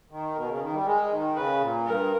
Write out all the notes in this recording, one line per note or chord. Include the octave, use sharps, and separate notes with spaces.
D#3
B2 A#4
C#3
D#3
G3
G#3 A#4
D#3
C#3 B4
A#2
G2 A#4